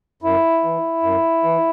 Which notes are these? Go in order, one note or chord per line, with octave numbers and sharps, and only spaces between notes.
F#2 E4
E3
F#2
E3